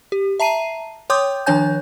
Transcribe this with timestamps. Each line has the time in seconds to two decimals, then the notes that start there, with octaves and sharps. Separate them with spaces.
0.12 G4
0.40 E5 A5 A#5 C7 D#7
1.10 C#5 G5 C6 D6 D#6 G6
1.46 D#3 F3 D4 C#5 G#5 G6